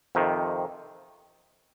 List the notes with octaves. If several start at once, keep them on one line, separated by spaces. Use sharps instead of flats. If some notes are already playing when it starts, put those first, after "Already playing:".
F2 C3 D#3